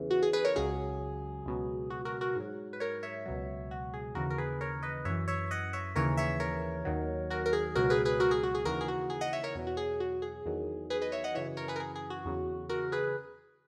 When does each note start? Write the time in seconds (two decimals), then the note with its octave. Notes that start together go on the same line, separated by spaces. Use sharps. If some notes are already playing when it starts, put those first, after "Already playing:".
Already playing: E2 C#3 E3
0.11 F#4
0.23 G#4
0.33 G#4 B4
0.45 A#4 C#5
0.56 C#2 C#3 F#3 G#4
1.45 C#2 B2 F#3
1.90 F#4
2.05 F#4 A#4
2.21 F#4 A#4
2.35 G#2 F#3
2.73 B4
2.80 A#4 C#5
3.03 C#5 E5
3.26 C#2 B2 F#3
3.71 F#4
3.94 G#4
4.15 D#2 C#3 E3 F#4 A#4
4.30 A#4
4.38 G#4 B4
4.61 A#4 C#5
4.83 B4 D#5
5.05 F#2 E3 C#5 E5
5.28 C#5 E5
5.51 D#5 F#5
5.73 C#5 E5
5.96 D#2 C#3 E3 A#4 C#5
6.17 C#5 E5
6.40 A#4 C#5
6.85 D#2 D#3 F#3
7.30 F#4 A#4
7.46 A#4
7.53 G#4
7.75 C#2 B2 F#3 F#4 A#4
7.90 G#4 B4
8.05 G#4 B4
8.20 F#4 A#4
8.31 G#4
8.43 F#4
8.55 G#4
8.65 D#2 C#3 E3 F#4 A#4
8.81 G#4
8.88 F#4
9.10 G#4
9.21 D#5 F#5
9.33 C#5 E5
9.43 A#4 C#5
9.55 E2 B2 F#3
9.67 F#4
9.77 G#4
10.00 F#4
10.22 G#4
10.45 E2 D#3 F#3
10.90 G#4 B4
11.02 B4 D#5
11.12 C#5 E5
11.24 D#5 F#5
11.34 F#2 C#3 E3 C#5 E5
11.57 A#4 C#5
11.68 G#4 B4
11.76 A#4
11.80 G#4
11.96 G#4
12.10 F#4
12.25 E2 C#3 F#3
12.69 F#4 A#4
12.92 G#4 B4